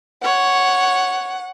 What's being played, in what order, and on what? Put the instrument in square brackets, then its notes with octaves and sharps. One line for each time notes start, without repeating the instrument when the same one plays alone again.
[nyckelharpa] C#5 [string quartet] F#5